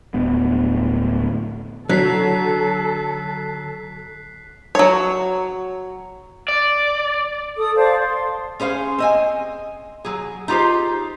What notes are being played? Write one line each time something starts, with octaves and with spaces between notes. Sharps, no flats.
D1 D2 B3
D3 F#3 A4 F#6 B6 C7
F#3 C#5
D5
A4 D#6
C5 D5 F5 A5
C6
C#4 G#4 C5 F5
C4 D#5 G#5
F#3 G#4
D#4 F4 G4 G#4 C5